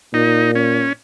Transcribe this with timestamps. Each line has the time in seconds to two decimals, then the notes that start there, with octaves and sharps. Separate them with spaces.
0.14 A#2 D#4
0.55 C#4